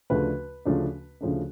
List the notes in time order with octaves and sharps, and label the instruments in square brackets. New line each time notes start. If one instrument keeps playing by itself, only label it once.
[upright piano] D2 C#3 F3 A3 D4 B4
D2 C#3 F3 A3 D4
D2 C#3 F3 A3 D4